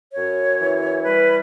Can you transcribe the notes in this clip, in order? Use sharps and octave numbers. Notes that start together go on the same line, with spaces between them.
F#2 C#5
E3
G3 B4